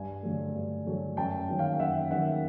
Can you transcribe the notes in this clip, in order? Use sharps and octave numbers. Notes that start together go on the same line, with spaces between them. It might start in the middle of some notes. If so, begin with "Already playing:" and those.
Already playing: G2 G#5
D3 F#3 A3
G2
D3 F#3 A3
F#2 G5 A5
D#3 F#3 A#3 C#4
F5 G5
F#2 E5 F#5
D#3 F#3 A#3 C#4 E5 F#5